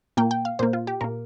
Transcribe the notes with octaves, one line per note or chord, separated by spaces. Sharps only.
A#2 A#3 G5
G5
F5
A#2 A#3 C5
F4
G4
A#2 A#3 A#4